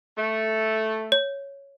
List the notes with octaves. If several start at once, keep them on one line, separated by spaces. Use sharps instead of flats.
A3
C#5